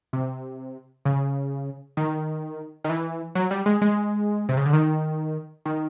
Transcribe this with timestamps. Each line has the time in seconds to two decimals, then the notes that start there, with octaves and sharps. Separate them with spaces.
0.13 C3
1.05 C#3
1.97 D#3
2.84 D#3
2.90 E3
3.35 F#3
3.51 G3
3.66 G#3
3.82 G#3
4.49 C3
4.57 C#3
4.66 D3
4.73 D#3
5.66 D#3